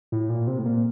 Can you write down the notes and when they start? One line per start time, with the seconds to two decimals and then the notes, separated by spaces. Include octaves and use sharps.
0.12 A2
0.29 A#2
0.47 C3
0.59 A2
0.65 A#2